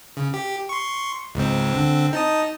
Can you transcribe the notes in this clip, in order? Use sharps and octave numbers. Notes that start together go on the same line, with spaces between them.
C#3
G4
C6 C#6
C#2 G#2 C4
D3 C4
D#4 A5 D#6